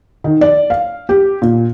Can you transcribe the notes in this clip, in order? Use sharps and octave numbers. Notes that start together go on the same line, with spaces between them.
D#3
D5
F5
G4
A#2